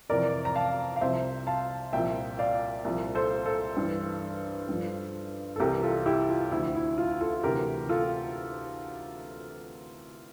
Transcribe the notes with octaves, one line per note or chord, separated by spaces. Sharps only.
F2 C3 E3 A#4 D5
A#5
F5 A5
F5
C2 C3 F3 C5 E5
F5 A5
C2 A#2 F3 E5 G5
D5 F5
C2 A#2 F3
A4 C5
A4 C5
G2 E3
G2 F3
A4
C2 C3 E3 G4 A#4
F4 A4
E4 G4
F4
D2 D3 F3 E4
E4
F4
F4 A4
D2 C3 E3 G4 A#4
F4 A4